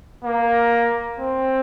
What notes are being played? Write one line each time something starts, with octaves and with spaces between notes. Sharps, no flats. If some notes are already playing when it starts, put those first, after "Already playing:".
A#3
C4